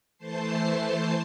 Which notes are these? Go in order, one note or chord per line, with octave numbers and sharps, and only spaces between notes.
E3 A3 C5 A5 C7